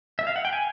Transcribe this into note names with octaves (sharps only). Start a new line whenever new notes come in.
E5
F5
F#5
G5
G#5